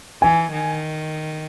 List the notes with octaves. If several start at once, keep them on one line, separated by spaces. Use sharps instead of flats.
E3 G#5
D#3